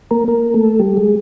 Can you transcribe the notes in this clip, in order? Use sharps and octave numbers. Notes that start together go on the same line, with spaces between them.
A#3 A#4
A#3 A#4
A3 A4
G3 G4
G#3 G#4